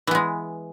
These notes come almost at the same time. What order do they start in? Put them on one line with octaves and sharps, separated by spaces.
E3 B3 G#3